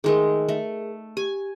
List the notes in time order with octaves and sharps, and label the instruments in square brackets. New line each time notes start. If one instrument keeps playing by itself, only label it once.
[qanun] D#3 G#3 A3 [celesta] G#4 A#4
[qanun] A3
[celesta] G4 [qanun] G#5